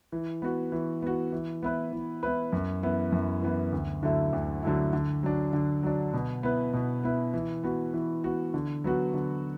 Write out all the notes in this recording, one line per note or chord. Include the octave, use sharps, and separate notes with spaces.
E3
B3 F#4
E3
B3 F#4
E3
B3 E4 B4
E3
B3 E4 B4
F#2
E3 B3 E4
F#2
E3 B3 E4
D2
D3 F#3 A3 E4
D2
D3 F#3 A3 E4
D3
F#3 D4
D3
F#3 D4
B2
B3 E4 B4
B2
B3 E4 B4
E3
B3 F#4
E3
B3 F#4
D3
F#3 B3 F#4
D3